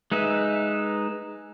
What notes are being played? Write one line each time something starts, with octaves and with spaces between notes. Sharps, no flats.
G#3 D#4 B4 E5